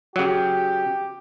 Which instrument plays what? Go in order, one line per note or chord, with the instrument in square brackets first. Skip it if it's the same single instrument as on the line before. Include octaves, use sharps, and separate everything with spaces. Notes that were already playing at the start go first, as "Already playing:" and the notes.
[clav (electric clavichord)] C#3 F#3 [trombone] G4